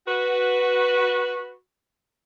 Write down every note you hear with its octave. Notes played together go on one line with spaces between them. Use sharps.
F#4 B4